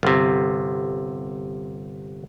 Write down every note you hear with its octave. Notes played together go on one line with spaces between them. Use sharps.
G1 C3